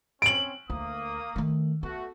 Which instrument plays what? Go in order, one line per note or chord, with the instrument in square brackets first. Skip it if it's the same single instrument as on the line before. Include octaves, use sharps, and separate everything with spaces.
[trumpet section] C4 C#4 [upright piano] D7 F#7
[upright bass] D2 [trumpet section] A#3 D#6
[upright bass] D#3 A3
[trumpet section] A3 F#4 [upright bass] B3